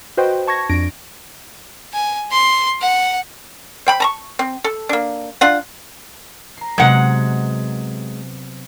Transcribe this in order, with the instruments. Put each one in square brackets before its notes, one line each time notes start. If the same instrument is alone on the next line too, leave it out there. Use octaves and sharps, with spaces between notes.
[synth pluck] F#4 B4 C5 D#5 G5
A5 C#6 G#6 A#6
F2 D4 A#6 D7
[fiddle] G#5
C6
F#5
[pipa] C5 G5 B5
A5 A#5 C#6
C4
A4
A#3 D4
D4 F4 F#5
[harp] A#5 C7
[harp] C3 F#3 B3 [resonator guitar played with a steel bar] G#3 F#5